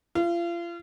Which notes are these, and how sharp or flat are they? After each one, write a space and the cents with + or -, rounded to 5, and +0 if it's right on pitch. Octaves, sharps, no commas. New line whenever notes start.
F4 -35